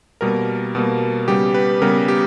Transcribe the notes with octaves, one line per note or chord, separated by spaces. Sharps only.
B2 G3 A#3 A#4
B2 G3 A#3
C#3 G3 B3 G4
B4
C#3 G3 B3 A#4
G4